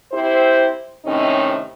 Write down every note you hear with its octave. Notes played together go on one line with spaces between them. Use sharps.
C4 E4 G4 C5
A2 C3 D#3 C4 C#4 D#4